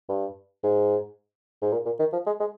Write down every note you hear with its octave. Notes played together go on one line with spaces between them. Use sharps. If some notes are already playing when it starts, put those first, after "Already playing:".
G2
G#2
G#2
A#2
A#2
D#3
F3
G#3
G#3